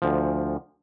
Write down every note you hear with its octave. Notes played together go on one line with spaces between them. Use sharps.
D2 F3